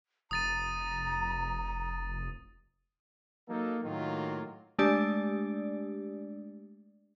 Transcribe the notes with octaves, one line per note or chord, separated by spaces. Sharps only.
F1 A#5 D#6 A6 D#7
F#3 A#3 D#4 A4
A2 D#3 F#3 A#3 F4
G#3 A3 D4 G4 D5